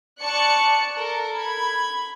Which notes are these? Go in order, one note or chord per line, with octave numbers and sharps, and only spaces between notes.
D5 A5 C#6 F#6 C#7
A4 A#4
B5 G#6